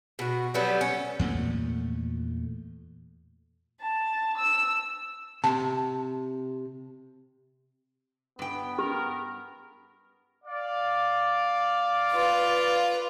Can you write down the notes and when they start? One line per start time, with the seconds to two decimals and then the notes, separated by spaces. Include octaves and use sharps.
0.19 B2 F#4
0.54 F#3 G3 B3 A4
0.81 C#4
1.19 E2 A#2 F3 A3
3.81 A5
4.38 E6
5.44 C3 A5
8.39 G2 B3 G5
8.79 G4 A#4
10.44 D5 F5
12.12 F4 B4